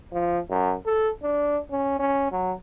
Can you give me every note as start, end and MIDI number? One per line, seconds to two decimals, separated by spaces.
0.12 0.39 53
0.50 0.75 42
0.86 1.09 69
1.23 1.58 62
1.71 1.96 61
1.99 2.27 61
2.32 2.53 54